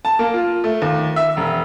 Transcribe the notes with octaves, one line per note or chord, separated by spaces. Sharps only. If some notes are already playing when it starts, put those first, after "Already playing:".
A5
A#3
F4
A3
D#2
E5
E1